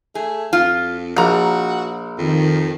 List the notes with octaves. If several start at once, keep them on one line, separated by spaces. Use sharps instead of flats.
A3 G#4
F2 F4
A#1 F3 F#4 A#5
F2 D#3